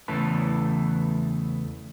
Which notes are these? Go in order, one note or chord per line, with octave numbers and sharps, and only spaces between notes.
E2 C#3 E3 A3 A4 B4